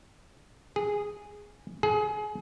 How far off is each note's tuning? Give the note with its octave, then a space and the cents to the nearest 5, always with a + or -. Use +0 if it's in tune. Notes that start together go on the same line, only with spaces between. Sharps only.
G#4 -5
G#4 +30